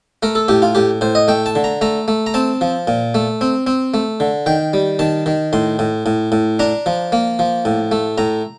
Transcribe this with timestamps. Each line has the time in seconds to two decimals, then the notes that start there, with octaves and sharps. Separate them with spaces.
0.23 A3 A#4
0.35 A4
0.48 A2 G4
0.62 F4
0.75 A2 G4
1.01 A2 C5
1.15 D#5
1.28 A3 G5
1.46 A5
1.55 D3
1.64 A#5
1.81 A3 A#5
2.08 A3
2.26 A#5
2.34 C4 A5
2.61 F3
2.87 A#2
3.15 A3
3.41 C4
3.67 C4
3.94 A3
4.20 D3
4.46 D#3 G5
4.73 G3
4.99 D#3 A5
5.26 D#3
5.53 A2 C6
5.79 A2
6.06 A2
6.32 A2
6.59 D4 A#5
6.86 F3
7.12 A#3
7.39 F3
7.65 A2
7.92 A3
8.18 A2 A#5